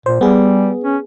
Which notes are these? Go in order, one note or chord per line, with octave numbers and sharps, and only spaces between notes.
A#2 C5
G3 B3 G#4
C#4